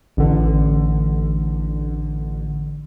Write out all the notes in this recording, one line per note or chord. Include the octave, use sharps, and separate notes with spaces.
A1 D3